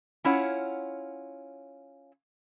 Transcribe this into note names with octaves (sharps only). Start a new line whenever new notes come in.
C#4 E4 F4 C#5 F#5